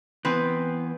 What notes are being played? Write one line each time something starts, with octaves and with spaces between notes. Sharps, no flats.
E3 B3 C4 B4